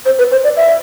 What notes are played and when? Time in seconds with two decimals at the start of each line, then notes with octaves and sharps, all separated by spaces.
0.06 C5
0.19 B4
0.31 C5
0.44 D5
0.57 E5